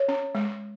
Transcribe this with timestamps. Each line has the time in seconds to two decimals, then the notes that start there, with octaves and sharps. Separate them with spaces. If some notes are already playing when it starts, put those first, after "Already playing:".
Already playing: C#5
0.08 C#4
0.35 G#3